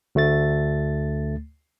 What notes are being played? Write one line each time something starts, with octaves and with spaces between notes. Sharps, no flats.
D2 A3 A6